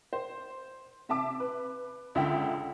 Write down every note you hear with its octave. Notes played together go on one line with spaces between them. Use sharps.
C5
C3 E5 A5 D6
B4
C#2 D3 E5 G5